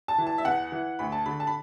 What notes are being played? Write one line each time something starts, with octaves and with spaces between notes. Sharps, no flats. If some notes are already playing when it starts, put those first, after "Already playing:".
A5
E3
A5
E5
E2 F#5
E3
D2 B5
A5
D3 B5
A5
B5